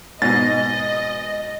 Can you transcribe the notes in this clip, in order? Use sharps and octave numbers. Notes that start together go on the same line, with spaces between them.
G#2 B2 D#5 A6